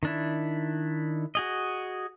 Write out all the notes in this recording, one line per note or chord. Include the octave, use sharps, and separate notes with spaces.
D#3 D4 E4
F#4 G#4 D#5